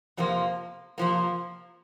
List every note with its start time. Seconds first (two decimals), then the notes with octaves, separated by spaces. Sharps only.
0.17 F2 C3 F3 A#3
0.98 F2 C3 F3 A#3